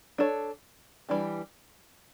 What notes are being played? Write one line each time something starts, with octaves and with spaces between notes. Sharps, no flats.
D4 A4 C#5
E3 G3 D4 G4